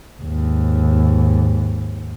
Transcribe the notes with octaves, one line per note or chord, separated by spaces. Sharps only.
D#2 G#2